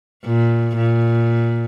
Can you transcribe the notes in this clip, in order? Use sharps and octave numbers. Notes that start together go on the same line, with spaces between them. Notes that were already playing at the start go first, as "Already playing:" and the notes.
A#2
A#2